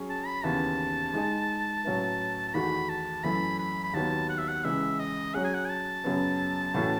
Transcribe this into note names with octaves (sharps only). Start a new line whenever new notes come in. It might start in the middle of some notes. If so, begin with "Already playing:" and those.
Already playing: F#3 C#4 G#4 C#5
A5
B5
D#2 C#3 E3 B3 A5
G#3 D#4 G#4 D#5
A2 F#3 C#4 E4 B4
A5
E2 D#3 A3 D#4 F#4 B5
A5
F#2 E3 A3 E4 B5
B5
B5
D#2 D#3 F#3 B3 A5
F#5
E5
F#5
C#2 C#3 E3 E5
D#5
F#3 C#4 G#4 F#5
G#5
F#5
G#5
A5
F#2 C#3 F#3 B3
A2 E3 A3 C#4 F#4